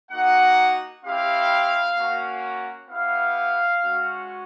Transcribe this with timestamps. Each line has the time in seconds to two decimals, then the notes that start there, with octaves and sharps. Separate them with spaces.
0.11 A#3 D#4 F#4 F#5
1.03 C4 E4 G4 F5
1.97 A#3 C#4 F#4
2.89 B3 E4 G4 F5
3.81 G#3 C#4 F#4